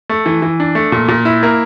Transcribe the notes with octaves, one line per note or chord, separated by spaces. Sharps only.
A3
E3
E3
D4
A3
A#2
A#2
E4
A#3